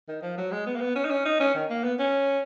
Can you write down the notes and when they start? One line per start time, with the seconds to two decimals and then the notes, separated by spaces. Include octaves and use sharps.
0.08 D#3
0.22 F3
0.38 F#3
0.51 G#3
0.66 B3
0.76 A#3
0.81 B3
0.95 C#4
1.05 D#4
1.11 C#4
1.25 D#4
1.40 C#4
1.54 D#3
1.70 A#3
1.84 B3
1.99 C#4